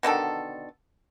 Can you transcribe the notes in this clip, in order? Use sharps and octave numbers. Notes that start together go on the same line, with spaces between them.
B2 D3 D#3 A4